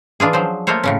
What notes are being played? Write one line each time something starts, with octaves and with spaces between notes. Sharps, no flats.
E3 D4 F4 G#4
F3 F#3 C5
A3 A#3 F4 C5 C#5
A2 C#3 C#4